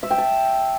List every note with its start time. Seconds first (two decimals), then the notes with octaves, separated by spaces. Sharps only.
0.03 E5
0.11 G5
0.18 A5